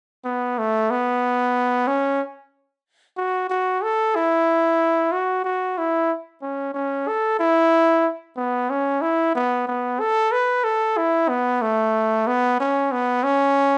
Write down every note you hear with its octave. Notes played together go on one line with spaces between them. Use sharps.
B3
A3
B3
C#4
F#4
F#4
A4
E4
F#4
F#4
E4
C#4
C#4
A4
E4
B3
C#4
E4
B3
B3
A4
B4
A4
E4
B3
A3
B3
C#4
B3
C#4